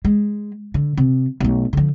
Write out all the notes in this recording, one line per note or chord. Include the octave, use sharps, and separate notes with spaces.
G#3
D3
C3
B1 A3
D3 F3